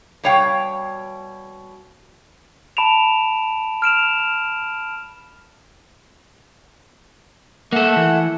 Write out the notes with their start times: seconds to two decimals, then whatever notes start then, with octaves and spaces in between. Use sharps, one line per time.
0.23 B2 G3 C#5 F5 G5
2.77 A5 B5 D7 E7 F7
3.82 F6 D7 E7 F7
4.20 F6
7.73 A3 A#3 A4 F#5
7.96 E3